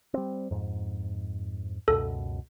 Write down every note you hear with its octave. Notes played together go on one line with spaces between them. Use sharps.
G3 C4
F2 G#2
C#2 F#2 B2 A4